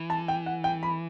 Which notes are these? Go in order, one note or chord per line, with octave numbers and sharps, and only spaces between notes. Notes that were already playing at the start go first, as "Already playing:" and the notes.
Already playing: E3
A5
G5
F#5
G5
B5